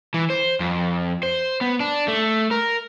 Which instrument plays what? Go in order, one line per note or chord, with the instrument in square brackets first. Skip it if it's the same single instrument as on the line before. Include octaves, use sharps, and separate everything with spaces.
[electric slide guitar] E3
C5
F2
C5
B3
D4
A3
A#4